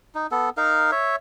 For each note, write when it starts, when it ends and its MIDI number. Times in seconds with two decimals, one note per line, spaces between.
0.15 0.27 63
0.31 0.50 59
0.31 0.50 69
0.57 0.91 63
0.57 0.91 70
0.57 0.91 77
0.92 1.16 73
0.92 1.16 76